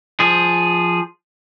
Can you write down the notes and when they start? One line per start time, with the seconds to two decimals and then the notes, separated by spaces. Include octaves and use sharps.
0.20 F3 G#4